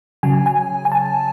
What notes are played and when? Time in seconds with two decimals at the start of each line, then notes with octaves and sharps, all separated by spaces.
0.23 C#3 F#3 G#5
0.46 G#5
0.85 G#5
0.92 A5